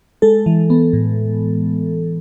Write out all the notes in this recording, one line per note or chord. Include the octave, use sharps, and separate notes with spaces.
G#3 A4
E3
B3
A2